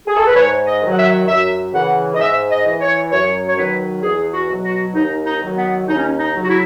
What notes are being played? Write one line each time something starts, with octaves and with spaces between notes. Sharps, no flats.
G#4
A4
B4
G#2 C#5
D#5
D#3 F#3
F#5
E5
F#2 E5
C#3 E3 F#5
D#5
G#2 E5
D#5
E3
C#5
F#2 C#5
C#5
D#3 F#3 B4
E2 G#4
F#4
B2 F#3
F#4
D#2 D#4
D#4
D#3 F#3
B3
D#2 D#4
C#4
D#4
D#4
C#3 F#3
F#4
E4